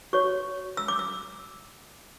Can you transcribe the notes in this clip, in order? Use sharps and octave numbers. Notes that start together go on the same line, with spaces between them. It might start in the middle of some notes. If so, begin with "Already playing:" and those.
F#4 C#5 C#6
E6
D6
E6